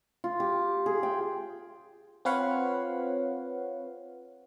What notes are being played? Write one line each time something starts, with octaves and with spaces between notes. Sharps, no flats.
F4
G4
G#4
G5
C4 F4 B4 C#5 F5 F#5